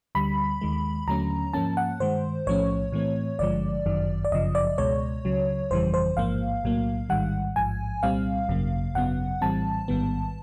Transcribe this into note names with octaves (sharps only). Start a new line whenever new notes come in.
D2 D3 G3 B5
D#2 D#3 G#3
D#2 D3 F#3 A3 C#4 A#5
G#2 F3 A#3 C#4 A5
F#5
G2 D#3 G#3 C5
B1 A2 F3 A3 C#4 C#5
A2 E3 A3 C4
G#1 G2 D3 F3 G#3 D5
G1 F#2 D#3 F#3
D5
G1 F#2 C#3 F3 D#5
D5
C#2 B2 G#3 C#5
C#2 C#3 F#3
G1 F2 C#3 E3 G3 C5
C5
A1 G#2 F3 A#3 F5
B1 A2 F#3 A#3
A1 G#2 D#3 G3 F#5
A1 G#2 F3 G#5
C2 A#2 G3 C4 F5
G#1 F#2 C#3 F#3 A#3
G#1 F#2 C#3 F#3 B3 F#5
A#1 A2 E3 G3 C4 A5
A1 G#2 D#3 G3 B3